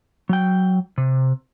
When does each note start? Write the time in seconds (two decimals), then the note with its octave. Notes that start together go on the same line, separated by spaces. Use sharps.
0.29 F#3 G5
0.98 C3